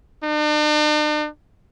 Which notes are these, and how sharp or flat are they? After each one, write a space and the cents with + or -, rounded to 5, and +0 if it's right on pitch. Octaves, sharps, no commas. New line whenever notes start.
D4 +45